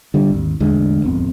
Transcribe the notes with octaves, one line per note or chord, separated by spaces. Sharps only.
D3 G3
G#1 D#2
A1 E2 D3 G#3
D#1 G#1 F2 B3